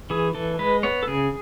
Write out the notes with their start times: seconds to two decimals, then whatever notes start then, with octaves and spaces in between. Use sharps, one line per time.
0.10 E3 G#4
0.35 E3 A4
0.59 G#3 B4
0.83 B3 C#5
1.03 A4
1.08 C#3 G#4